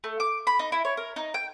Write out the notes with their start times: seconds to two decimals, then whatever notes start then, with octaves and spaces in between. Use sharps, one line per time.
0.04 A3
0.20 D6
0.47 B5
0.59 D#4
0.72 E4
0.85 C#5
0.97 A#4
1.16 D#4
1.34 G5